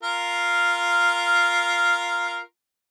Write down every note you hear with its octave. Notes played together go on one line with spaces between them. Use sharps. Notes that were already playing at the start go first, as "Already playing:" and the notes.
F4 A#4